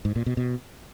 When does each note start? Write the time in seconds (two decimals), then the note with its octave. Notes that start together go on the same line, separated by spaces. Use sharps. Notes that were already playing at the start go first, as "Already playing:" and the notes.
0.05 G#2
0.16 A#2
0.26 B2
0.37 B2